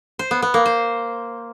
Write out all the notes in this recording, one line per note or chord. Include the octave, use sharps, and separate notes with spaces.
C5
B3
B3
A#3
C5